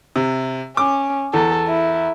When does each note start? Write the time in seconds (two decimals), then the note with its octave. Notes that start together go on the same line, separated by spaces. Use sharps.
0.16 C3
0.77 C#4 D6
1.34 E2 A4
1.69 E4